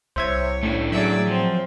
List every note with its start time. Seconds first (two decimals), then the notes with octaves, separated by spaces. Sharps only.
0.16 C2 C5 C#5 E5 G#6
0.63 A2 A3 C#4 D4
0.92 F#3 G#4 D5 E5
1.27 F3 C4